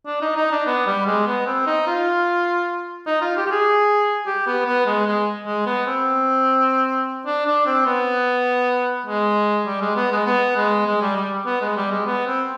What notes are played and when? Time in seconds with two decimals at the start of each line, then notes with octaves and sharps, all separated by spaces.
0.06 D4
0.21 D#4
0.36 D#4
0.51 D4
0.66 B3
0.86 G3
1.06 G#3
1.26 B3
1.46 C4
1.66 D#4
1.87 F4
3.06 D#4
3.21 F4
3.36 G4
3.46 G4
3.51 G#4
4.26 G4
4.47 B3
4.66 B3
4.86 G#3
5.06 G#3
5.46 G#3
5.66 B3
5.87 C4
7.26 D4
7.46 D4
7.66 C4
7.86 B3
9.06 G#3
9.66 G3
9.81 G#3
9.96 B3
10.11 G#3
10.26 B3
10.56 G#3
10.86 G#3
11.01 G3
11.17 G3
11.46 B3
11.61 G#3
11.76 G3
11.91 G#3
12.06 B3
12.26 C4